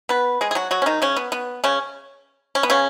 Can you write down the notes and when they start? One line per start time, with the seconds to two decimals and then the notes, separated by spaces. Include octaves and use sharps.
0.09 B3 B4
0.41 G#3 G#4
0.51 G#4
0.55 F#3 F#4
0.71 F#3 F#4
0.82 C#4
0.86 D#3 D#4
1.02 C#3 C#4
1.17 B3
1.32 B3
1.64 C#3 C#4
2.55 C#4
2.63 B3
2.70 C#3 C#4